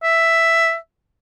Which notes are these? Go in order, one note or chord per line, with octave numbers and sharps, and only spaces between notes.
E5